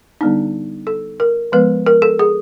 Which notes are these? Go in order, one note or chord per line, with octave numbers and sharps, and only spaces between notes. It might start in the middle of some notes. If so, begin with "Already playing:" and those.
D3 G3 B3 D4 D#4
A4
A#4
F3 G#3 B3 B4
A#4
A4
G#4